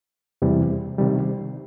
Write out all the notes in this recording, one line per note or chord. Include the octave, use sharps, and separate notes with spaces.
E2 C3 E3 G3
C3 D#3 G3